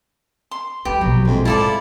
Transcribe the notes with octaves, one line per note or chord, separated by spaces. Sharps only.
C6
G3 G4 B4
A#1 B2 F#3
F2 C3 G#3
G#2 E4 F4 A4 D5